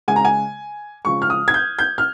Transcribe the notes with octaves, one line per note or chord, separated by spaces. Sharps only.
C#3 G#3 G#5
A#5
G#5
C#3 F3 G#3 C#6
F6
D#6
G#6
G6
G6
F6